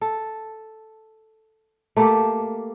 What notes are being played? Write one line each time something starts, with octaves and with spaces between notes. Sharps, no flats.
A4
A3 A#3 G4 A4